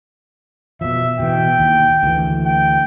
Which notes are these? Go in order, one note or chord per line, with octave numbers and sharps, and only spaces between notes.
B2 F3 E5
B2 E3 G5
D#2
D2 E3
G5